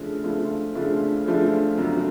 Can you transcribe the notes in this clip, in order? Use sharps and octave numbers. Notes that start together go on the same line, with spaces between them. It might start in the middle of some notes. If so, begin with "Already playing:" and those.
Already playing: C#3 F3 A3 D4 F4
C#3 F3 A3 D4 F4
C#3 F3 A3 D4 F4
C#3 F3 A3 D4 F4
F#2 D3 F3 A3